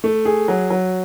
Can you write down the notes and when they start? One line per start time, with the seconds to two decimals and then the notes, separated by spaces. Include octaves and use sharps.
0.04 A3
0.25 G#4
0.48 F#3
0.70 F#3